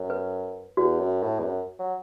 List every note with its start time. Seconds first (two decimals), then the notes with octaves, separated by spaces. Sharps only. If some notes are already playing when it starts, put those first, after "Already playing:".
Already playing: F#2
0.10 B4
0.77 E2 F#4
1.00 F#2
1.23 A2
1.39 E2
1.45 F#2
1.79 F#3